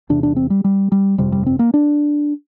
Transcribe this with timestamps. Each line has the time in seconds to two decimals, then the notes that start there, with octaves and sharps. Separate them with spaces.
0.09 E1 E2 C3 D4
0.23 D4
0.36 C4
0.50 G3
0.64 G3
0.92 G3
1.18 G1 F2 C3 G3
1.32 G3
1.46 C4
1.59 A#3
1.74 D4